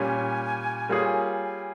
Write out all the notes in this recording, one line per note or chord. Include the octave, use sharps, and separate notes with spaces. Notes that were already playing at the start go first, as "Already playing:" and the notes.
Already playing: A#2 G3 C#4 G#5
G3 A#3 F4 G#4 C#5
G#5